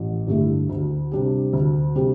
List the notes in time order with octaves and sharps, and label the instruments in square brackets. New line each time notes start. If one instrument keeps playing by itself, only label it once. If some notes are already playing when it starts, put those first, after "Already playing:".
Already playing: [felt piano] A1
G2 D3 A3 E4
D2
C3 G3 D4 G4
D2
C3 G3 D4 G4